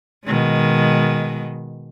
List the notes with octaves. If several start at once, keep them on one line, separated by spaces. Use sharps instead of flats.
B2 D#3 G#3